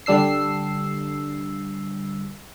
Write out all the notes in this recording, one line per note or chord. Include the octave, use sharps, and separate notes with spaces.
D3 G3 D4 E6 C7